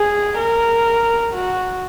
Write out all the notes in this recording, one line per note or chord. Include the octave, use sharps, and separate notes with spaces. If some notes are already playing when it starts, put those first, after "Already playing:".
Already playing: G#4
A#4
F#4